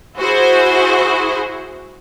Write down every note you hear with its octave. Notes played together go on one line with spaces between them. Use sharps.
E4 F#4 G#4 C5